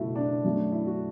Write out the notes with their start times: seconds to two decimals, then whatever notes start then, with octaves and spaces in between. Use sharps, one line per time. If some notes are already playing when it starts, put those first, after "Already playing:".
Already playing: F#1 B2 A3 E4 F#4 A4
0.15 D4
0.44 F#2 F#3 A3
0.72 E4
0.86 F#4